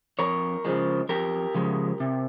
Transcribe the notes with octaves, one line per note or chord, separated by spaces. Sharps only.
F2 A#4 C#5
C#3 F3 G#3
F2 G4 A#4
C#3 F3 G#3
C3